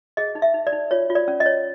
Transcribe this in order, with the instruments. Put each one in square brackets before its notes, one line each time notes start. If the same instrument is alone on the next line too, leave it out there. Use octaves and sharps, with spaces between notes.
[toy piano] G#4 D#5
D#4
E5
D#4
D5
D#4
F4 C#5
F4
D5
C#4
D#5
C#5